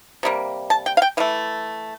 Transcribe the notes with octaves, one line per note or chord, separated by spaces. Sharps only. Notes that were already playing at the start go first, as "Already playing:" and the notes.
C3 G3 A#3
A5
G5
F5
G5
E3 A3 F5